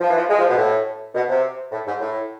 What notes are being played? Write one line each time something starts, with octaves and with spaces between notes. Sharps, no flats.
F3
E3
F3
G#3
F3
B2
A2
B2
C3
A2
G#2
A2